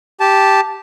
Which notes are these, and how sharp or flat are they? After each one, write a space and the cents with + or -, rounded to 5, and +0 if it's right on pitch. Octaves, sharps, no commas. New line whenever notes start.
G4 +0 A5 -5